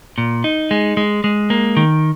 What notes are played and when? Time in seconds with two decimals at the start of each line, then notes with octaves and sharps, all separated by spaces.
0.18 A#2
0.44 D#4
0.71 G#3
0.97 G#3
1.24 G#3
1.50 A#3
1.77 D#3